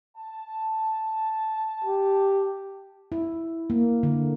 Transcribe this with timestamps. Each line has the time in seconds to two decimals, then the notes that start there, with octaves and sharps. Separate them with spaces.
0.17 A5
1.84 G4
3.12 E4
3.70 A#3
4.03 D3